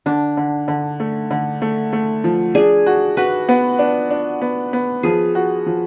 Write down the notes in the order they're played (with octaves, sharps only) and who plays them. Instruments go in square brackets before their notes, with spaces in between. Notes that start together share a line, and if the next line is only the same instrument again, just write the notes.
[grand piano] D3 [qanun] D4
[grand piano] D3
D3
A3
D3
A3
A3
F3
[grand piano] D4 [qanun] G#4
[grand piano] F#4
[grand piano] F#4 [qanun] B4
[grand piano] B3
D4
D4
B3
B3
[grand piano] F3 [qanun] G#4
[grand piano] F#4
F3